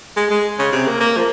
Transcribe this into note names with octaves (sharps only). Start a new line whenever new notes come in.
G#3
G#3
C#3
C3
A#3
A#3
F3